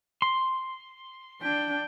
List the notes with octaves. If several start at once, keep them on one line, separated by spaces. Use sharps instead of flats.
C6
D4 G5